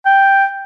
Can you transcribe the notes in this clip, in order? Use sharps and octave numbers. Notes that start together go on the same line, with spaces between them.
G5